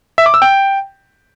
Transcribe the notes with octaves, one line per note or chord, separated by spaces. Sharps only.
E5
D6
E6
G5